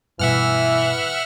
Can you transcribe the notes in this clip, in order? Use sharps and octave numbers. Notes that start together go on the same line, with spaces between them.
G2 B2 E3 E5 F#5 F6